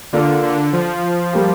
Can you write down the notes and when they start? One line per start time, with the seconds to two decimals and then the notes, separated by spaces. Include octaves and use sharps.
0.13 D3 A#3 F4 A#4 D5
0.43 D3
0.73 F3
1.33 G3 A#3 G4